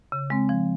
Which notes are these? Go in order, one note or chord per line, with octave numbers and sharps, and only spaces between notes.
C#3
G#3 C4
F3